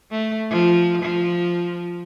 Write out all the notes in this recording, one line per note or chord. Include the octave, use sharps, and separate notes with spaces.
A3
F3
F3